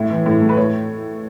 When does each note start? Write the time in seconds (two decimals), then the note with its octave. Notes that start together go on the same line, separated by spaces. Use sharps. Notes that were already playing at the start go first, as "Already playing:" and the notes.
Already playing: A2 E5
0.10 E3
0.26 A2
0.42 A3
0.49 B4
0.57 A2 C#5